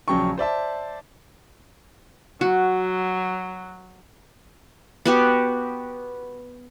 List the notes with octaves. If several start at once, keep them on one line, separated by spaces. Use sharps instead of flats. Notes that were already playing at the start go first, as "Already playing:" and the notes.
A#1 C#3 F#3 G5 A5 C#6
C5 D5 E5 A5
F#3 F#4
B3 F#4 G4